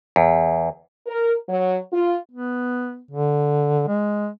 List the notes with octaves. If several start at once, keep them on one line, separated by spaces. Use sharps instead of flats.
E2
A#4
F#3
F4
B3
D3
G#3